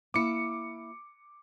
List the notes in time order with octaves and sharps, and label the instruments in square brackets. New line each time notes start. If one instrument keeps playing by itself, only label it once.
[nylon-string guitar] A#3 E4 [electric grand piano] D6 C#7